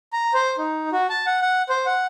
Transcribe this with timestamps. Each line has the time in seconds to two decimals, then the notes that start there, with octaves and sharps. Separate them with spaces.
0.13 A#5
0.34 C5
0.58 D#4
0.92 F#4
1.10 A5
1.26 F#5
1.42 F#5
1.69 C5
1.86 F#5